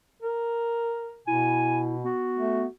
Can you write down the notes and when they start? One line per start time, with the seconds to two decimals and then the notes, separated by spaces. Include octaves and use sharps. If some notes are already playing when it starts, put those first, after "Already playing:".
0.22 A#4
1.27 B2 E4 G#5
2.04 B3 F#4
2.38 A3